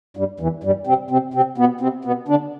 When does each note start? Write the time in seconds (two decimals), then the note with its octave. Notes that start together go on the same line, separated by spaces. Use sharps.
0.17 G2 G3
0.40 E2 E3
0.64 G2 G3
0.87 C3 C4
1.11 C3 C4
1.34 C3 C4
1.58 B2 B3
1.81 C3 C4
2.05 B2 B3
2.28 D3 D4